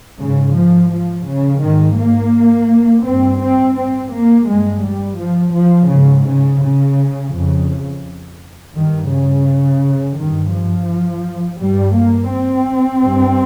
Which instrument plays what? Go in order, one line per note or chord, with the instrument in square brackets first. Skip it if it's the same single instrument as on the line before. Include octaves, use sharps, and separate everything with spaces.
[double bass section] G#2 C#3
F3
F3
C#3
G#2 D#3
A#3
G2 C4
C4
C4
A#3
G2 G#3
G3
F3
F3
G#2 C#3
C#3
C#3
F2 C#3
G2 D#3
C#3
G2 D#3
F3
G2 G3
A#3
C4
G2